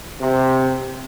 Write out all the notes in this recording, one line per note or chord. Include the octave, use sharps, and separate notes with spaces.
C3